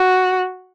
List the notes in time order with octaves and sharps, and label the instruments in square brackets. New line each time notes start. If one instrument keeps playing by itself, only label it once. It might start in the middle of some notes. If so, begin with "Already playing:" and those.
Already playing: [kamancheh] F#4